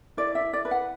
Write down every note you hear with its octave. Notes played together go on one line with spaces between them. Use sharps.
E4 D5
E5
E4
D5
B4
F#5